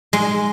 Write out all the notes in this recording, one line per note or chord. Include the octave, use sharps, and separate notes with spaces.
G#3